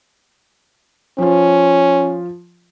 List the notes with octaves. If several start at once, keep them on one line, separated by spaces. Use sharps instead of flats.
F3 C#4 F4